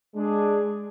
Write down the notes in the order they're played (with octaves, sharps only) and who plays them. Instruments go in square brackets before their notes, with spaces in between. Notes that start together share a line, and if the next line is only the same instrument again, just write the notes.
[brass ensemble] G#3 D4 G#4